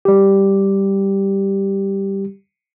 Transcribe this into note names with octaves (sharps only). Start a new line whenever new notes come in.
G3 G4